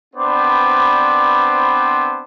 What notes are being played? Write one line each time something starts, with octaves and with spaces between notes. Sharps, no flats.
B3 C4 D4 B4 C5 D5